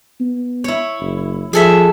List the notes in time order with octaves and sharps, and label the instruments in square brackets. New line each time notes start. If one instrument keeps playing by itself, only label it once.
[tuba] B3
[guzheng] E4 C#5
[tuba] F#1
[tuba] F3 [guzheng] G#4 A4 E5